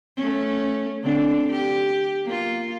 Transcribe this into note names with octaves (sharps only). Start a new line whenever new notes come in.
A3 C#4
D3 C4 D4
G4
A#3 F4